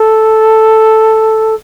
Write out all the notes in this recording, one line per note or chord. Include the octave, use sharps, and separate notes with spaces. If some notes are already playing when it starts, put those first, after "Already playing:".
Already playing: A4